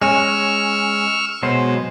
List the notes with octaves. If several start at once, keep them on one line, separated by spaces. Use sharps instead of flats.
G#3 C#4 C#6 E6 F6
B2 F#3 G#3 C5